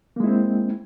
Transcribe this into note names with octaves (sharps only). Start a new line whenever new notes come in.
G#3 A#3 C4 E4